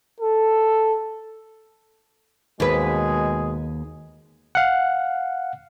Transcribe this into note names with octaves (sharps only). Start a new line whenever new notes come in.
A4
D#2 B2 G#3 G#4 B4
F5 F#5